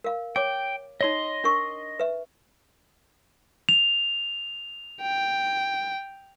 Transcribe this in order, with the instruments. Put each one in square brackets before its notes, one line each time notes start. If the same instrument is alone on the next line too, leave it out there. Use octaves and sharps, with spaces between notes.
[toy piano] A#4 F5
[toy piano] C#5 D6 [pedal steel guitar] G5
[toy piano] D#4 C#5 [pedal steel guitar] D#5 C6
[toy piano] D4 A#4 C#6
B4 E5
[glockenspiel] F7
[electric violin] G5